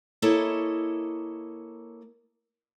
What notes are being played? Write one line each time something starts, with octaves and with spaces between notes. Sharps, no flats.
A#3 E4 A4 C#5 D#5